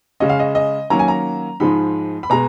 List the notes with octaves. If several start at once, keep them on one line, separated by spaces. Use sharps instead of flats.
C#3 G#3 C#4 D#5
F5
D#5
D#5
D#3 F#3 A#3 C#4 A#5
G#5
A#5
G#2 F3 G#3 D#4 B5
B5
B2 G#3 A#5